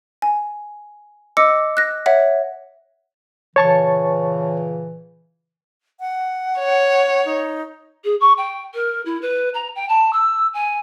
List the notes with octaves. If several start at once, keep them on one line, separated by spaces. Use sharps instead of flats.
G#5
D#5 D6 E6 C#7
F#6 A#6
C#5 E5 F#5
A#2 C#3 E3 C#5 A5 C#6
F#5
C#5
D#4
G#4
C#6
G5
A#4
E4
B4
A#5
G5
A5
E6
G#5